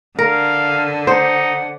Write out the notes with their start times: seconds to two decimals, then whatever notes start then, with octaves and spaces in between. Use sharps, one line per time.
0.19 D3 A#4 F5
1.07 D#4 C5 F#5